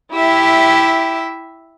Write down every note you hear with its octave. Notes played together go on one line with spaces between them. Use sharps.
E4 G4 E5